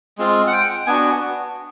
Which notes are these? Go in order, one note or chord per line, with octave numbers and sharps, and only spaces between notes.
G#3 C4 F4
F#5
G5
B3 D4 F#4 G#5